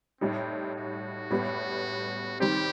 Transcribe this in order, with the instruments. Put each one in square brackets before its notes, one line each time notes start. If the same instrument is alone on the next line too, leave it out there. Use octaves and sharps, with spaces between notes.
[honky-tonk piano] A2 G3 D#4 [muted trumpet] C4
[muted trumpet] F#4
[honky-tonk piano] A2 G3 B3
[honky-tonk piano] D#3 G3 C4 [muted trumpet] G4